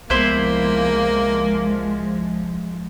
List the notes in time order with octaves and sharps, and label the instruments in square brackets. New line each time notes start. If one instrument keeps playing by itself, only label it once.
[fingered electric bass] C2 B3 [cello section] F3 G#3 [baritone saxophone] A#3 [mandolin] E4 C5 C6